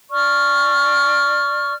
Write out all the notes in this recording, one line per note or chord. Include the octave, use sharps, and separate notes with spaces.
D5 C#6 F6